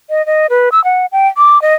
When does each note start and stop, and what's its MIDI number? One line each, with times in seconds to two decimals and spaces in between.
0.10 0.25 75
0.26 0.47 75
0.50 0.69 71
0.72 0.83 88
0.84 1.06 78
1.12 1.27 79
1.37 1.61 86
1.62 1.74 75